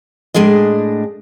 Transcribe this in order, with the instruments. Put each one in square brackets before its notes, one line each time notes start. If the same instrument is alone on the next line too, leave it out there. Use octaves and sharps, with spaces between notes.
[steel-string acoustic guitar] A2 G#3 D4 G#4 D#5